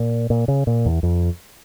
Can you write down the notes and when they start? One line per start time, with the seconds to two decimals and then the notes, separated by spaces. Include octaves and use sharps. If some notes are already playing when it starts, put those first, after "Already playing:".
Already playing: A#2
0.30 A#2
0.48 C#3
0.67 A#2
0.85 E2
1.03 F2